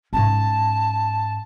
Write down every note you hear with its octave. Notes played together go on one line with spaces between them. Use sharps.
G#2 C#4 A5